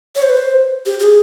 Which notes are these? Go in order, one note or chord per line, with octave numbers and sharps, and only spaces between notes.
C#5
C5
B4
C5
G4
G4
G#4